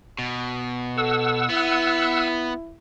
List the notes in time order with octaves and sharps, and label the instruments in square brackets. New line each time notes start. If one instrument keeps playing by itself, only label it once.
[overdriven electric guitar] B2
[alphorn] A4 [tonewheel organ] F#5 E6
[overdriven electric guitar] B3 [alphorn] E4